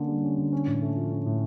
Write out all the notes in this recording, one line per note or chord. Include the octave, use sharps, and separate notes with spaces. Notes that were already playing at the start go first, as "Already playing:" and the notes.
Already playing: D3 A#3 C#4
G3
C#4
D3
C#4
A2
A3
F3
C#4
A2